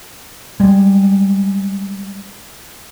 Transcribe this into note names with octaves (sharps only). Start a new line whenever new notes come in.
G3 G#3